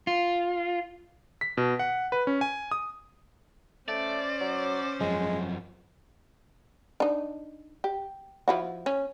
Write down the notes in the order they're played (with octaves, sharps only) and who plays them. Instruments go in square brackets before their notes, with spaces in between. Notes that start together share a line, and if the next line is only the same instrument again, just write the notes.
[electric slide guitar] F4
[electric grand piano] B6
B2
F#5
B4
C#4
G#5
D#6
[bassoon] A3 [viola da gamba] C#4 C5 [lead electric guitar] D5
[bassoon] F#3
[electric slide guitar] F#2 F3 [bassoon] G#3
[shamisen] D4 D#4
G4
F3 E4 F#4
C#4